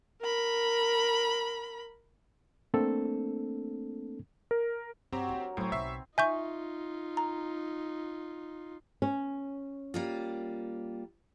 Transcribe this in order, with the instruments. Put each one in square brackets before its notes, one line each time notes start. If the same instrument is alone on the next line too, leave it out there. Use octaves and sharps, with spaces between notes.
[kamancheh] A#4 B5
[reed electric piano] A3 A#3 C4 D4 A4
[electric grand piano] A#4
[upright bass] G2 [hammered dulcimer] F#3 C#5 [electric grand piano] C4 G4 A#5
[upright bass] D4 E4
[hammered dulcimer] A#4
[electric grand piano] A2 [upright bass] F#3 E4 [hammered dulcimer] C4 B4 C#5
[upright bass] B1 [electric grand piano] E5 C#6 C7
[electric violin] D#4 F4 [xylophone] E5 C#6 [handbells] G#5 G6
[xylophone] A#5
[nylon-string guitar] C#4
[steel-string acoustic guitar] G3 A#3 F4